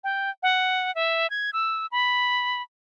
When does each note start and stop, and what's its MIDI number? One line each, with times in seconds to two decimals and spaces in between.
0.04 0.30 79
0.43 0.94 78
0.95 1.30 76
1.30 1.50 92
1.53 1.86 88
1.92 2.62 83